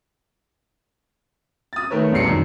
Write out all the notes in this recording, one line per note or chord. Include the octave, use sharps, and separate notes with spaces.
D#6 A6
D#3 A3 A#4 B4 C#5
B1 E2 C3 G3 C7 C#7
F#2 D#3